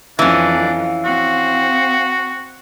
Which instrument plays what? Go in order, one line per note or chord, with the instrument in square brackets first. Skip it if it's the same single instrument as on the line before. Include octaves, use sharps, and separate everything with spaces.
[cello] F2 [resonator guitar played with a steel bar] E3 C#4 [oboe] D4 [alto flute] F5
[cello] C4 [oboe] F#4